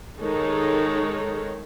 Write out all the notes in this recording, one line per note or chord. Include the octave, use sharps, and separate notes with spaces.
D#3 G#3 D#4 A4 C#5